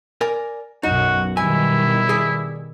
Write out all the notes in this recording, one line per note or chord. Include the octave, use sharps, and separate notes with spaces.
A#4 D5 G#5
B1 F#2 D#4 F#4
B2 D#3 G3 E4 G#5
G#4 D5